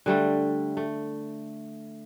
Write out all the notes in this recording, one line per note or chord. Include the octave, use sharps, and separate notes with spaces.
D3 G3 A3
A3